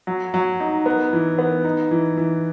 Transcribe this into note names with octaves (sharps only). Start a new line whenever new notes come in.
F#3
F#3
D#4
B3
E3
B3
D#4
E3
E3